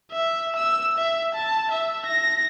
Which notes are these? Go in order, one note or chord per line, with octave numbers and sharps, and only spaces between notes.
E5
E6
E5
A5
E5
A#6